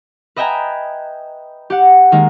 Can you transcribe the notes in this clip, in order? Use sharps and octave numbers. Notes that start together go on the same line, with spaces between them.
B4 D#5 E5 G5 G#5 A#5
G4 F#5
D#3 G#3 A#3